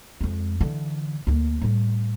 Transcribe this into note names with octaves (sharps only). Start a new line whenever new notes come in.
F2 G#3
D3 E3
D2 A#3
A2 G3